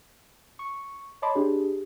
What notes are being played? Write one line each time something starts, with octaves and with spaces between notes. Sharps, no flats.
C#6
C#5 D#5 A5 B5 C6 D6
D4 G4 G#4